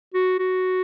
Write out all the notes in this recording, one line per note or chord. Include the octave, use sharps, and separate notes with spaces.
F#4
F#4